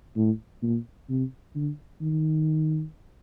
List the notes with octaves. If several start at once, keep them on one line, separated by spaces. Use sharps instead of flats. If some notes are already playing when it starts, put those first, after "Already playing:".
A2
A#2
C3
D3
D#3